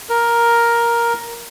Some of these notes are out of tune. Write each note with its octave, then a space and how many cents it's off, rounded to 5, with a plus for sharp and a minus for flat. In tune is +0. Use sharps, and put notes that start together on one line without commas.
A#4 +5